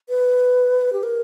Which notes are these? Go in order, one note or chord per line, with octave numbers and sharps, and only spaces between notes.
B4
G4
A#4